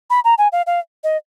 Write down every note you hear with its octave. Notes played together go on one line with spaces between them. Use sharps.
B5
A#5
G#5
F5
F5
D#5